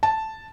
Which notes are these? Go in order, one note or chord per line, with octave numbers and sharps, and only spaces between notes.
A5